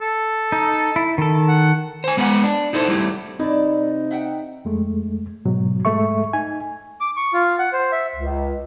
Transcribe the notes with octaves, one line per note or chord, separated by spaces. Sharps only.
A4
D#4
E4
D#3 A4
F#5
C5 G#5
G#3 B3 B4 C#5 F#5
D4
D#4 E4 A4 C5
G3 A3 E4 G4
C3 D#4 E4 D5
E5 F#5 G5
F2 G#3 A3
G#2 B2 F#3
G#2 G#3 A3 A4 E5 C#6
D#4 G#5
D6
C#6
F4
F#5
C5
E5
C#2